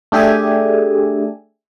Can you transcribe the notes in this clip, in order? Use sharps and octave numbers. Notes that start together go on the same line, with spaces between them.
A3 D4 G4 G#4 E5 G#5